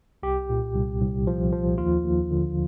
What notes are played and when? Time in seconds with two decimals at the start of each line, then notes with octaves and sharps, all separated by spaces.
0.23 C2 G4
0.49 A#2
0.75 C2
1.00 C2
1.27 F3
1.52 F3
1.78 D#2 F4
2.04 D#2
2.30 D3